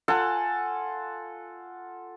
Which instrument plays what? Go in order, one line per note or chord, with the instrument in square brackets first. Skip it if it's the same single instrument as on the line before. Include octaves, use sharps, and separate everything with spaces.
[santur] F4 A4 F#5 G#5